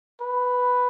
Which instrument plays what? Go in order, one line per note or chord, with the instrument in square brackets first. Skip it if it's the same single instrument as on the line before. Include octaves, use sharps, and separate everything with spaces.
[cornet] B4